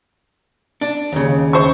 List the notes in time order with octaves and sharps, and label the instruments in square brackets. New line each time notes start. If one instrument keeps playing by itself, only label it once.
[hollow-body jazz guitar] D4
D#2 C#3
[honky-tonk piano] C5 C#6